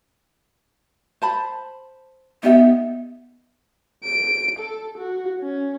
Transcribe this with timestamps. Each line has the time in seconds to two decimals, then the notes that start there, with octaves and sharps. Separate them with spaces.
1.22 C5 A5 B5
2.43 B3 D#4 G4 E5
4.04 D7
4.59 A4
4.98 F#4
5.41 C#4